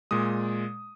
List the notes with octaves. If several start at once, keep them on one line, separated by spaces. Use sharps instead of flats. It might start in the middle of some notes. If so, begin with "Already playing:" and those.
A#2 G#3 D#6